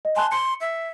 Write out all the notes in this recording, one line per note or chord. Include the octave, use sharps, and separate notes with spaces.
D#5
G#5 A5 C6 F#6
C6 C#7
E5